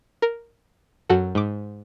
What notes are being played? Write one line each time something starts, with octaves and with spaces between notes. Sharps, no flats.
A#4
F#2 F#4 A4
G#2 D6